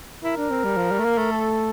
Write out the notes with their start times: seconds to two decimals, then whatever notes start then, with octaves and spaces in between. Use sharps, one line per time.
0.23 E4 A#4
0.37 D4
0.50 C4
0.64 G3
0.77 F3
0.91 G3
0.99 A3
1.05 A#3
1.18 A3
1.32 A4